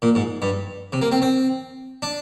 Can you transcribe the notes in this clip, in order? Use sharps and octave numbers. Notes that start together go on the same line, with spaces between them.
A#2
G#2
G2
C3
A#3
C4
C4
D4